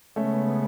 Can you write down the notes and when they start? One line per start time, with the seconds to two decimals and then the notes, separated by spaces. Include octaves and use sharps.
0.16 C#3 G#3 A3 B3 C#4